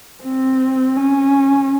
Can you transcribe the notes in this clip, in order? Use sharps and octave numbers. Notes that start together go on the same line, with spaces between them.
C4
C#4